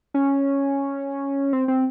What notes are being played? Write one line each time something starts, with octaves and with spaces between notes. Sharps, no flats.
C#4
C4
C4